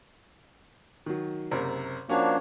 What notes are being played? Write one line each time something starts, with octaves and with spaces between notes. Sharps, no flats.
D#3 F#3
F#1 C3 A#4
F3 A#3 C#4 D4 F#4 C#5